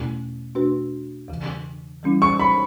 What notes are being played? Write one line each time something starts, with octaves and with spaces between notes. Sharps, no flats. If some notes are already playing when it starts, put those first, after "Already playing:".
Already playing: E2 B2 A3 C#4 E4
B2 A3 D4 F#4 B4
E2 C#3 E3
E3 G3 C#4 E4
C#6
B5